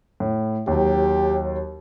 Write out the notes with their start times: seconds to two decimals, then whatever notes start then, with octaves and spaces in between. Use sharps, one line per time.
0.20 A2
0.67 D#2 F#3 G4